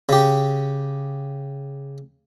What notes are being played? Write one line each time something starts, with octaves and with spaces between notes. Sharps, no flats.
C#3 G4